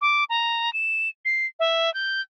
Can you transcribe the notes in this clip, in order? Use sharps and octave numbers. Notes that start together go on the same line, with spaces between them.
D6
A#5
E7
C7
E5
G6